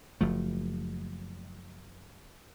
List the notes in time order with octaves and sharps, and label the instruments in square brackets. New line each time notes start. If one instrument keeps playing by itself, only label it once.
[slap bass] F#1 F3 A3